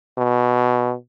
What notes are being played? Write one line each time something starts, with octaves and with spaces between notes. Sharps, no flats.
B2